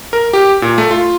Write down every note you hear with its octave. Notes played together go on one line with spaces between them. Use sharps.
A#4
G4
A#2
A3
F4